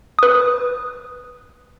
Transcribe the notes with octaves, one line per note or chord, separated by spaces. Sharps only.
B4 D#6